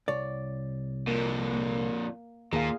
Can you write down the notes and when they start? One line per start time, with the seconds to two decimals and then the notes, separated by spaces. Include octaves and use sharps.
0.08 C2 C#5 D5
1.07 F2 A#2 A#3
1.53 A#3
2.53 D#2 A#2 G#4 F5